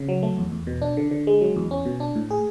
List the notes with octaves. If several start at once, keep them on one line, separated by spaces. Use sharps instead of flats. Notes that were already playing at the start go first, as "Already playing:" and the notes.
Already playing: C#3
F#3
A3
E2
E2
B2
D4
D3
D3
G#3
F#3
E2
C#4
B2
D4
A2
G#4